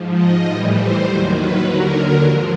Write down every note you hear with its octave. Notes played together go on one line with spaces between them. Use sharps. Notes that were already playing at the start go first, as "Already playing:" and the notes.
Already playing: G#2 F3
D#5
A2 E3 G3 D#5
C5
D#2 D#3 F#3 C5
B4
D#2 D3 F#3 A#4
G#2 F3